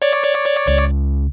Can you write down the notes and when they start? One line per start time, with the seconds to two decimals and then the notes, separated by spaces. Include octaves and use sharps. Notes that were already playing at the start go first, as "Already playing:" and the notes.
0.02 C#5 D5
0.67 C#2